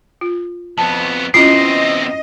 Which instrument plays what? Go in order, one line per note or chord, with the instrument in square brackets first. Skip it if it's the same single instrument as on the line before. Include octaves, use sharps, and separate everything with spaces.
[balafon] F4
[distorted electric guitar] F2 B3 [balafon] A5
[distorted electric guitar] E2 C4 [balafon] C#4 E4 F4 [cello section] D#5 [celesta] C7